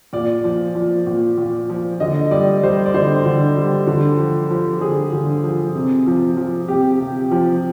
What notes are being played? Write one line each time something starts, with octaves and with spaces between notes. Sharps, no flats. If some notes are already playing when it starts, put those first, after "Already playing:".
A#2 D5
F3
F3
A#2
A#2
F3
D3 D#5
G3 D5
G3 C5
D5
D3 C5
D3
G3
D3
F3
F3
D3 G#4
D3
F3
C3
F3
F3
C3 G4
C3
F3